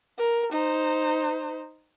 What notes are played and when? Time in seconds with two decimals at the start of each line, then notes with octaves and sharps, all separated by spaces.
0.18 A#4
0.52 D#4 C5